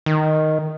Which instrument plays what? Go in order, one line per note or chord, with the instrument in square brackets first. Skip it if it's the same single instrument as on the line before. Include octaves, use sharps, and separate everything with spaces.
[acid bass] D#3